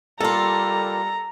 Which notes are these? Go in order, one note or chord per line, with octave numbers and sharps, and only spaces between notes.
G3 A#3 F4 A4 A#5